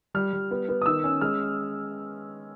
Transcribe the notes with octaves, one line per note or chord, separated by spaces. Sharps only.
G3 F6
G3
B3
B3
D#6
D#3 E6
C#4
G#3 F6